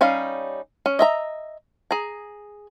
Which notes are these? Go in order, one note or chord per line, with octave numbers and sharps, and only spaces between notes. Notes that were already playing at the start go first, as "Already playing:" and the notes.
G3 C#4 D#4 F5
C#4
D#5 E5 A#5
G#4 A#5